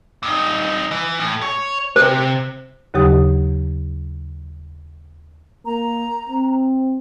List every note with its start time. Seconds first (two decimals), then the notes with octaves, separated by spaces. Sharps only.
0.23 G2 D#4
0.91 E3
1.20 A2
1.42 C#5
1.96 C3 C5
2.94 D#2 C#3 F#3 G4 D#6
5.66 A#3 A#5
6.29 C4